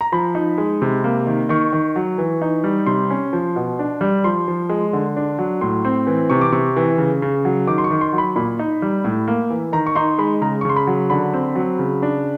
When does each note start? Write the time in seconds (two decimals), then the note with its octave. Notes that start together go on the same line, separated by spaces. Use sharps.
0.01 A#5
0.12 F3 B5
0.35 D#4
0.58 G#3
0.82 C3
1.04 A#3
1.27 D#3
1.49 D#3 C#6
1.73 D#3
1.96 F#3
2.18 E3
2.42 D#4
2.64 G3
2.86 C3 C6
3.11 C#4
3.33 F3
3.56 B2
3.79 D4
4.01 G3
4.24 F3 C6
4.48 F3
4.69 G#3
4.93 D3
5.16 D4
5.39 F#3
5.61 A2 C6
5.85 C4
6.07 E3
6.30 C3 C#6
6.41 D6
6.52 C3 C#6
6.76 E3
6.98 C#3
7.22 C#3
7.45 F#3
7.67 D#3 D6
7.78 C6
7.84 C#6
7.91 D#3
8.01 C6
8.13 F#3
8.18 B5
8.36 A#2 B5
8.59 D#4
8.82 G3
9.05 A2
9.28 A#3
9.50 E3
9.73 D#3 A#5
9.86 C#6
9.95 D#4 C6
10.18 G#3 B5
10.42 C#3 A#5
10.61 C#6
10.65 C#3 C6
10.76 B5
10.87 F#3
11.10 D3 B5
11.34 C4
11.56 F#3
11.79 C#3
12.02 D4